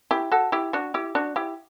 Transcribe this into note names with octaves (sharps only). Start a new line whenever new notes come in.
E4 G4
F#4 A4
E4 G4
D4 F#4
E4 G4
D4 F#4
E4 G4